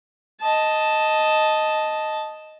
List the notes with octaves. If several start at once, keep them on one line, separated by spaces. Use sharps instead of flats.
D#5 A5